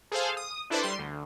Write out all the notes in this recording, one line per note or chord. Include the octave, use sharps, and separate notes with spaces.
G#4 A4 C5 F5
D#6
D4 E4 A4 B4 C5 D5
G3 C6
D2